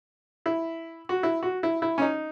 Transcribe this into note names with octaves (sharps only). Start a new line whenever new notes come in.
E4
F#4
E4
F#4
E4
E4
C#4
D#4